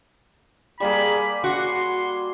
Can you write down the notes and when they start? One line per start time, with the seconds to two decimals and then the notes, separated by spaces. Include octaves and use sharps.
0.80 G3 A#3 G#4 B5
1.44 F#4 C6